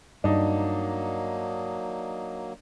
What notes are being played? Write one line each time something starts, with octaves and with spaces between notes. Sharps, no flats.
G2 F#3 A#3 D4 D#4